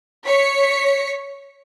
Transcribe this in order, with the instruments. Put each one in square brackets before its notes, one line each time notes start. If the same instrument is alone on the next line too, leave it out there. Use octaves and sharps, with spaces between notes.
[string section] C#5 B6 C#7